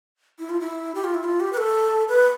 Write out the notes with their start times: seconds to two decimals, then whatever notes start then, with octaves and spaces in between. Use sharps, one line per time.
0.39 E4
0.49 F4
0.60 E4
0.95 G4
1.04 F4
1.14 E4
1.24 F4
1.40 G4
1.53 B4
1.57 A4
2.08 B4